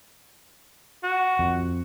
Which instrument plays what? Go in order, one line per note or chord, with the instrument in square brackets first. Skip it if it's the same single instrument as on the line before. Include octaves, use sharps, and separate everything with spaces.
[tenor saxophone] F#4
[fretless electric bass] F2